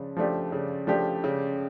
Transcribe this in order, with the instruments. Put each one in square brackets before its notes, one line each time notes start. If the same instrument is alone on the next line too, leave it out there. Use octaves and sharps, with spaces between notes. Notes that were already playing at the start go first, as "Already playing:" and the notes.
Already playing: [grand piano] C#3 F3 D4
F3 A3 D4 G4
C#3
F3 A3 D4 G4
C#3